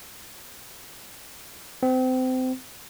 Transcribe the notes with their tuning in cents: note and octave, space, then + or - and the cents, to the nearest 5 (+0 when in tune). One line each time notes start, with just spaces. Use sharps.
C4 -30